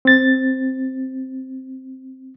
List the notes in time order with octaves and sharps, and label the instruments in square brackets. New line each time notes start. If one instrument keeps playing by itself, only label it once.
[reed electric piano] C4 A6